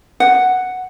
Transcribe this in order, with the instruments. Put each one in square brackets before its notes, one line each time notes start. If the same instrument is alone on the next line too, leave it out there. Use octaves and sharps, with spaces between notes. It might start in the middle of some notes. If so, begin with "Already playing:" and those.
[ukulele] F#5